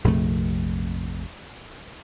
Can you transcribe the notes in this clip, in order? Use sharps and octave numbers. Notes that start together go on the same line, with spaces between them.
A#1 F2 C3 A3